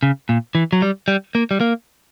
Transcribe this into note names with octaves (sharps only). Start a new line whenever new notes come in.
C#3
A#2
E3
F#3
G3
G3
A#3
G3
A#3